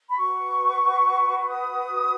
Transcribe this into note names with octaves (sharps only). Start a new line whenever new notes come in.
B5
F#4 B4 C#6
C#6
D#6